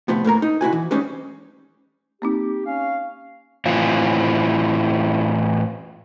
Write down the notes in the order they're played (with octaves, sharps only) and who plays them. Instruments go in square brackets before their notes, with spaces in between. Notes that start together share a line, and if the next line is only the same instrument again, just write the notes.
[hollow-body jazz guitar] A2 C3 F3 B3
A2 A#3 A#4 A#5
D#4
C3 E4 F#4 G#5
E3
G3 G#3 C4 C#4 D#4
[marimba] A#3 C4 D#4 [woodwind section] G4
[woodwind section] C#4 F5
[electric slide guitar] A2 E3 C4 F4